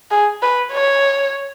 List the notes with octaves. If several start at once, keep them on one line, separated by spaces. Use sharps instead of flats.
G#4
B4
C#5